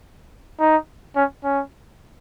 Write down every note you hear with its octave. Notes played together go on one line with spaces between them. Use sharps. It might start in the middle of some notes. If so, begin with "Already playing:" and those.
D#4
C#4
C#4